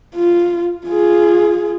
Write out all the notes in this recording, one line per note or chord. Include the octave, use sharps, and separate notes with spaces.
F4
F4 G#4